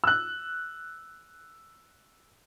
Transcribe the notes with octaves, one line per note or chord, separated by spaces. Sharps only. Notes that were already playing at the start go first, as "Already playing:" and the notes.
E6 F#6